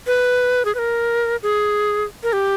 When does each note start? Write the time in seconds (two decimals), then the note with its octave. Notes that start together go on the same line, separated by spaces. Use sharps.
0.07 B4
0.65 G#4
0.75 B4
0.79 A#4
1.43 G#4
2.23 A#4
2.34 G4